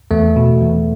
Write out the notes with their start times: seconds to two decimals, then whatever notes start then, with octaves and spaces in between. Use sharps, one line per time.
0.11 E2 A3
0.36 B2
0.61 E2